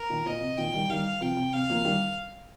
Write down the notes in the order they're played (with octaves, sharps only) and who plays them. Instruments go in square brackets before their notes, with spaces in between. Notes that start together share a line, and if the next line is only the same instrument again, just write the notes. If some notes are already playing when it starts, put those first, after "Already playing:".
Already playing: [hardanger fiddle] A#4
[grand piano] A#2 D#3
[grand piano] A#2 [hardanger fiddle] D#5
[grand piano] C3
[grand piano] A#2 D#3 [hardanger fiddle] G5
[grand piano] D#3 G3
[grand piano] D#3 G3 [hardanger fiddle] F5
[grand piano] C3 F3 [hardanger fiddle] G5
[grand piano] C3
[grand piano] C3 [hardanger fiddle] F5
[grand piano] F3 A#3
D#3 G3